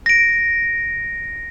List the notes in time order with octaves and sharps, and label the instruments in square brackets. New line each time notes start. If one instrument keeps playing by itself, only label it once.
[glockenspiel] A#6 D7